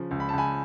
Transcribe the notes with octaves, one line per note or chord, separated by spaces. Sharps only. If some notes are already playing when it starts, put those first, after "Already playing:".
Already playing: C#3 F3
C#2
B5
A5
C#2 G#5 B5